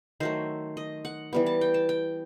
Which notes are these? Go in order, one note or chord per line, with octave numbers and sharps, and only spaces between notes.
D#3 F#3 A3 C5
D#5
F#5
E3 G3 B3
A5
G5
A5
G5